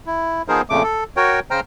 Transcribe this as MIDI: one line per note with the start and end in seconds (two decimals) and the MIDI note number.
0.06 0.42 64
0.48 0.62 53
0.48 0.62 59
0.48 0.62 63
0.48 0.62 68
0.48 0.62 70
0.48 0.62 72
0.70 0.83 41
0.70 0.83 46
0.70 0.83 49
0.70 0.83 57
0.70 0.83 86
0.84 1.04 69
1.17 1.40 66
1.17 1.40 70
1.17 1.40 73
1.17 1.40 79
1.51 1.60 49
1.51 1.60 72
1.51 1.60 79
1.51 1.60 82
1.51 1.60 89